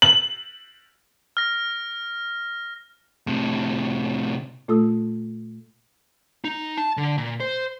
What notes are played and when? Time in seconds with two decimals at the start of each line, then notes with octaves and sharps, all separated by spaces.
0.02 F#7
1.37 F6 A#6
3.27 A2 C3
4.68 A#2 A3 F4 A4 D#6 E6
6.44 D#4
6.78 A5
6.97 D3
7.18 A#2
7.40 C5